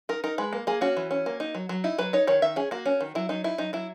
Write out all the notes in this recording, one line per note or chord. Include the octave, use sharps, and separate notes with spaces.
D#4 A#4
D#4 A#4
G#3 B4
A#3
A#3 G#4
C#4 F#4
E3
C#4
A#3
D#4
F#3
F#3
D#4 E4
F#3 B4
D#4 C#5
D#3 C#5
D#3 E5
C#4 G#4
A#3 F#4
C#4
D#3
F#3 E4
F#3 D#4
D#4 E4
F#3 D#4
F#3 E4